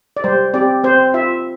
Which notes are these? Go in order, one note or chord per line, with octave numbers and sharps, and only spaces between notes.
D5
G3 C5
C4 G4 D5
C4 C5
F4 E5